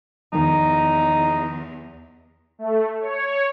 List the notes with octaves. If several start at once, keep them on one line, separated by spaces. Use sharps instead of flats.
E2 D#3 F3 D#4
A3
C#5